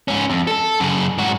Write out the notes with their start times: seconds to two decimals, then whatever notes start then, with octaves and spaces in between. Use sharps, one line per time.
0.08 G#2 C#4
0.30 F2
0.47 A4 A5
0.80 F#2 C#3
1.18 G#2 F#4